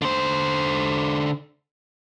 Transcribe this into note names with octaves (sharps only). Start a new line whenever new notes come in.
D3 C5